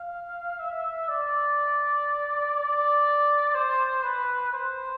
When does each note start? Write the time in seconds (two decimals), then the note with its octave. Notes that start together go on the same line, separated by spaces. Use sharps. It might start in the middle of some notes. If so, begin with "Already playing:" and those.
Already playing: F5
0.60 E5
1.09 D5
2.56 D5
3.55 C5
4.04 B4
4.53 C5